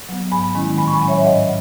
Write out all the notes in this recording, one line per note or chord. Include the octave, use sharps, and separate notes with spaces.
F#3 B3
G#2 G#5 B5
D#3 G#3 C#4 E4
A2 G#5 B5
C#6
G#5 B5
F#3 C#4
C#5 E5
G#2 D#5 F#5